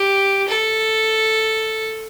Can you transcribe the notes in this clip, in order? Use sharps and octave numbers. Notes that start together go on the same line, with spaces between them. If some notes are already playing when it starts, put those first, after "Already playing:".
Already playing: G4
A4